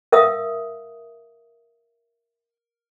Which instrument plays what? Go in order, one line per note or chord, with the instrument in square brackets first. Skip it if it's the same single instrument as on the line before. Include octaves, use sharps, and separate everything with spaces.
[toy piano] A#4 E5 F5 D#6